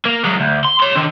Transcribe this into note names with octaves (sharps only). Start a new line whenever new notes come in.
A#3
F#3 G#3
D2
C6
C#5 C6
D3 D#3